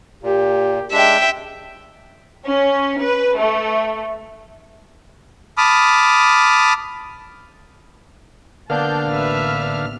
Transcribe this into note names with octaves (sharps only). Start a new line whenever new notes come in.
A#2 G4
G#3 D4 E5 G5
C#4
B4
A3
A5 B5 D6 D#6 F6
D3 A#3 B3 D4 F5 A5 G6
A1 B4 E5 F6